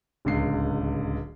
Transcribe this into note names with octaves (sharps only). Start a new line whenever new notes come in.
D1 C#2 C7